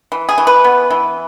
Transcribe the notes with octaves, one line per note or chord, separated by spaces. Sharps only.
E3
G#4
E3
B4
B3
E3